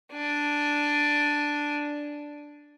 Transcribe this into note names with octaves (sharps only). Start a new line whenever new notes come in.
D4 G#5